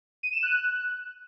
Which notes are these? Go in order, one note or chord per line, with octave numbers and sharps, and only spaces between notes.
D#7
E7
F#6